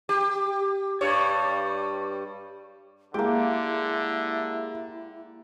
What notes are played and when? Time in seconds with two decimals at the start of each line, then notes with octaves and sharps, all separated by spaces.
0.09 G4
1.01 G2 G3 C#5
3.14 D3 G#3 A#3 E4 G4